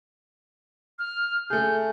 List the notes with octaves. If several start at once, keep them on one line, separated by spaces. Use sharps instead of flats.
F6
A3 G#4 G6